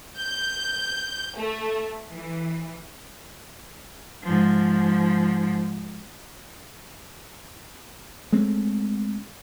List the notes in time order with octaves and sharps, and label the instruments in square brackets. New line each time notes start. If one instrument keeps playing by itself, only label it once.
[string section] G6
A3
E3
[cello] G#2 F3
[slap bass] G#3 A3 C4 C#4